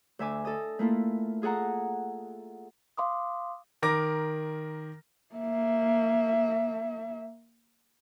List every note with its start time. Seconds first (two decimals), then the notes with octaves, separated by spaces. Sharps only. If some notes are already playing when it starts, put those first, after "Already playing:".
0.19 D2 E5 G#5 D6
0.45 A4 D#5
0.79 A3 A#3 E4 F4
1.42 F4 G#4 A4 F#5 A#5
2.97 F5 C6 D6 D#6
3.82 D#3 A#4 D6 A#6
5.35 A#3 E5